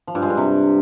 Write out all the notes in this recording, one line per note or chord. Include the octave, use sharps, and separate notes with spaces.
F3
G2
G#3
G2
C3